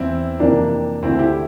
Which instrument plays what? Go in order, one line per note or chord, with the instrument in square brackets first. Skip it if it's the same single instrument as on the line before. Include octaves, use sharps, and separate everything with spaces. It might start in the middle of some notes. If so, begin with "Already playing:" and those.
Already playing: [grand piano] E2 E3 C4 E4
F2 C3 E3 A#3 D4
D2 D3 C4 E4
E4 G4